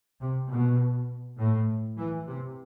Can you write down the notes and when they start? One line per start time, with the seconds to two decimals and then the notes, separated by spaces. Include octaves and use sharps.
0.21 C3
0.50 B2
1.39 A2
1.98 E3
2.27 C3